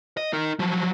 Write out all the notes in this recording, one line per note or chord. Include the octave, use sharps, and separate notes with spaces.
D#5
D#4 A#4
F3 F#3